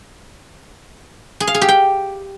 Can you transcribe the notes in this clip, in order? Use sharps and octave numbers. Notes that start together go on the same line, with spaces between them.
G#4
F5
G#4
G4
G5